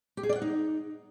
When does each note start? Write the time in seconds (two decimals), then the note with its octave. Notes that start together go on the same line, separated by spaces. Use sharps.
0.17 G4
0.23 G#4
0.29 D5
0.35 F#5
0.42 D#4